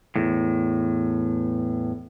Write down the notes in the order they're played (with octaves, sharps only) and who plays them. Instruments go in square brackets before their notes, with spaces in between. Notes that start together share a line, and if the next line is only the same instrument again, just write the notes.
[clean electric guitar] E2 A2